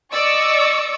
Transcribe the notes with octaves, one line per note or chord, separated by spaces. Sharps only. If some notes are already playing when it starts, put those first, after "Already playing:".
D5 D#5 C#6 D6 E6 C#7